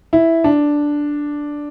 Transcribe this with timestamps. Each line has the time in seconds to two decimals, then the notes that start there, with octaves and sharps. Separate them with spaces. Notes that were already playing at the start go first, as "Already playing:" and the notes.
0.13 E4
0.44 D4